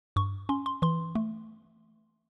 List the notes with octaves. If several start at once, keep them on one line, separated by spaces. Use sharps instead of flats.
G2 C#6
C#4 C6
C6
E3 C6
A3